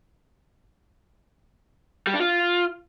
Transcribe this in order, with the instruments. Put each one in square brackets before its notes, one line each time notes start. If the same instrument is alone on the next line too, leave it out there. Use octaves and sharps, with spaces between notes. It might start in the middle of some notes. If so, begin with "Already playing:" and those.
[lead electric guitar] G3
D4
F4